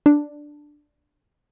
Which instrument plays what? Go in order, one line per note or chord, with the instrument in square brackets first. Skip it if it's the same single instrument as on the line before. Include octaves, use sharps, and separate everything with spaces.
[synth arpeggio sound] D4